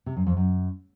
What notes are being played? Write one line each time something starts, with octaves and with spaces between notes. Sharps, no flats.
C3
F#2
F2
F#2